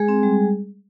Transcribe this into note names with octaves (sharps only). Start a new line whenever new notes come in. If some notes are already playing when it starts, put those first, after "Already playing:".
Already playing: G#3 G#4
C4
G3